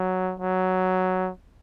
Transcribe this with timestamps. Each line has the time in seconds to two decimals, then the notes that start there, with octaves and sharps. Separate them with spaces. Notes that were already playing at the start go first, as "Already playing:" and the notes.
Already playing: F#3
0.40 F#3